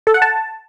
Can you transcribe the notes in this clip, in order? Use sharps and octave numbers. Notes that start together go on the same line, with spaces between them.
A4
F#5
A5